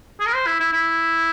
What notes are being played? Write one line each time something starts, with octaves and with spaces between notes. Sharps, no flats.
G#4
A#4
C5
E4
E4
E4